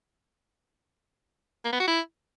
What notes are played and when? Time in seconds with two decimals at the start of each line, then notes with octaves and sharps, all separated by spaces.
1.64 A#3
1.72 B3
1.80 F#4
1.87 E4